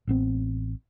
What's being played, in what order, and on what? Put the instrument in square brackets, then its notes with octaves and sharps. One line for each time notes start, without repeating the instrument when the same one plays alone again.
[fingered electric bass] A1 B3 C4